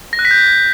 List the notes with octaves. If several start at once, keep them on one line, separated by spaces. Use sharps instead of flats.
A#6
F#6
B6
G6